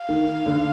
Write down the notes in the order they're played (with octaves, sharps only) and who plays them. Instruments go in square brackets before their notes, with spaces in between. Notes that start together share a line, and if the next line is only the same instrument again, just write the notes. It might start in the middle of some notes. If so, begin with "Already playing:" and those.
Already playing: [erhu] F5
[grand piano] D#3
D3